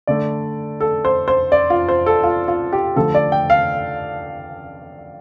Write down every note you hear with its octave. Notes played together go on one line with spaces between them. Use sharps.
D3 A3 D5
A4
C5
C5
D5
F4
C5
A4
F4
F4
G4
D3 F3 A3 A4
D5
G5
F5